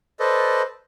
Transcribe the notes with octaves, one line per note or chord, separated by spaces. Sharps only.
A4 B4 C5 D5 D#5